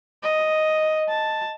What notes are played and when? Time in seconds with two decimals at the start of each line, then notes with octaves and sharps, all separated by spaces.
0.23 D#5
1.09 A5